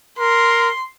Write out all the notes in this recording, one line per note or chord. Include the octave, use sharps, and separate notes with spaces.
A#4 C6